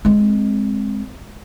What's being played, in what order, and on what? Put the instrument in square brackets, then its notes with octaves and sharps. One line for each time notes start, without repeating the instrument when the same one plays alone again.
[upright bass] G#3 C4